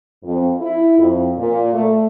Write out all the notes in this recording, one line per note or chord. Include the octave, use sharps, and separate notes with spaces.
F2
E4
F2
A#2
A3